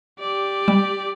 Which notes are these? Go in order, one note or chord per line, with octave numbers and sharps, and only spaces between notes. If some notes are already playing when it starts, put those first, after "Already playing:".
G4 D5
G3